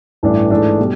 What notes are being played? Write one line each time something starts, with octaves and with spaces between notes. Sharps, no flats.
A1 G2 E3 A3 D4
G#2 E3 A3 D4
B2 G3